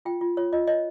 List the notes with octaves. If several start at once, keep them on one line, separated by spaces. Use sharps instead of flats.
F4 G5
F4
F4 C#5
F4 D#5
C#5 D#5